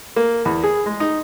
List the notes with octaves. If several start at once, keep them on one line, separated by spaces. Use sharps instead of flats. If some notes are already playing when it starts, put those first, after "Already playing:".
A#3
E2
G#4
G#3
D#4